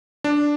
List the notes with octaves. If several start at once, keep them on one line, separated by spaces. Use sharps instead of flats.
D4